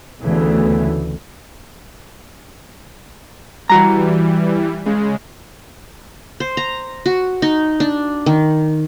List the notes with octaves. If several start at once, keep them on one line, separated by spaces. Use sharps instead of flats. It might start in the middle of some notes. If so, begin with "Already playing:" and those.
D2 C#3 E3 A3 B3
E3 G3 F#4 A#5
C#3 G#3
C5
A#5
F#4
D#4
D4
D#3